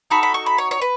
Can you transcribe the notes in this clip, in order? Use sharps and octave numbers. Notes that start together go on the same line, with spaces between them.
D#4 F#4 A4 B5
B5
C#6
B5
C#5
C#5
B4